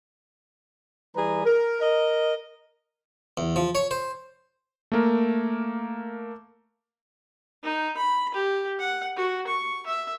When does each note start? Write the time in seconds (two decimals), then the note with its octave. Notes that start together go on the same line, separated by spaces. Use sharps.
1.16 E3 G3 G#4 B4 A#5
1.45 A#4
1.81 A#4 D#5
3.37 E2
3.56 F3
3.75 C#5
3.91 C5
4.92 A3 A#3 A#4
7.63 D#4
7.97 B5
8.34 G4
8.79 F#5
9.17 F#4
9.47 C#6
9.86 E5